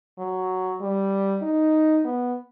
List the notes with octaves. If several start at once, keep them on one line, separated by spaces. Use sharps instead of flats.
F#3
G3
D#4
B3